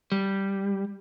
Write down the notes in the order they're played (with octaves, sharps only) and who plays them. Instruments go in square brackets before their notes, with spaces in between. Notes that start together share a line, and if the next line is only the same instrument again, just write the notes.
[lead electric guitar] G3